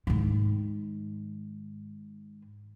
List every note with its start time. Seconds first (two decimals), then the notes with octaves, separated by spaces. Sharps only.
0.07 G#2 D#3